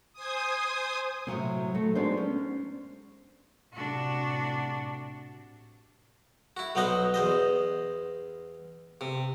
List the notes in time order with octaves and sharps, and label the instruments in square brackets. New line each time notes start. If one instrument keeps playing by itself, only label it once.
[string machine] C5 G#5 D#6
[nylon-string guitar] A2 C3 F#3 C4
F#3 A3
F#3 G#3 B3 D4 D#4 C5
C#4
[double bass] A2 C3 [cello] D4 F#4
[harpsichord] E4 F#4
B1 F#3 B3 C5 D#5 F#5
E2 C5 D#5
C3